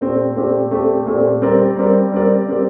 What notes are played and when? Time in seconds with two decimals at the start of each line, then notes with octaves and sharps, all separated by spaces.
0.01 A#2 A3 C4 G4
0.36 A#2 A3 C4 G4
0.71 A#2 A3 C4 G4
1.06 A#2 A3 C4 G4
1.42 G3 C4 G4 A#4 D5
1.77 G3 C4 G4 A#4 D5
2.12 G3 C4 G4 A#4 D5
2.48 G3 C4 G4 A#4 D5